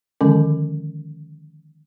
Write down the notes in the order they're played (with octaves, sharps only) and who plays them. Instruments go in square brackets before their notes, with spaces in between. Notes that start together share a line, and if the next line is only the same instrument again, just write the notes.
[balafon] D3 D#3 F3 G#3 C#4